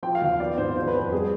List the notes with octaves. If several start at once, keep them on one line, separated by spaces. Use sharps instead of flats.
F3 G5
F5
D#2
B3 D5
G#2 C5
F3 C5
B4
F2
B4
G3 G#4